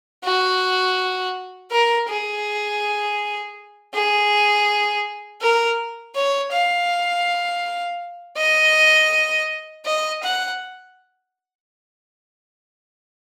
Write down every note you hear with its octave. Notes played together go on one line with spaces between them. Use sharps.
F#4
A#4
G#4
G#4
A#4
C#5
F5
D#5
D#5
F#5